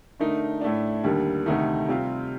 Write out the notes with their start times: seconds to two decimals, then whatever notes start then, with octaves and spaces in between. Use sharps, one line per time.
0.20 D3 A3 D#4 A#4
0.61 A2 A3 D4
1.04 D#2 D3 G3 A#3
1.46 D2 C3 D#3 A3 D#4
1.88 C3 G3 C4 F4